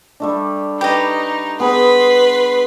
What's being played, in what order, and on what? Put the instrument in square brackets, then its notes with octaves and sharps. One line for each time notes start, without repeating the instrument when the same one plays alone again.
[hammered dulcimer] G3 A3 D4
[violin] D#4 [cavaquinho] G4 D#5 [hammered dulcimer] B4
[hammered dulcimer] B3 G#4 [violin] B4 C6